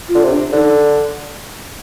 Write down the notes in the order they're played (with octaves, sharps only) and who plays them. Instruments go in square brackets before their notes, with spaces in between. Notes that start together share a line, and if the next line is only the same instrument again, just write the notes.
[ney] F4
[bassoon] D3
C3
[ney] D4
[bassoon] D3 [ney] D#4